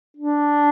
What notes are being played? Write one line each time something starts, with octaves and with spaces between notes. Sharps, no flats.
D4